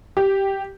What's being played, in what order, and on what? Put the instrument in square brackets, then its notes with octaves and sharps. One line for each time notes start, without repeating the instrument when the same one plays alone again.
[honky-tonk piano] G4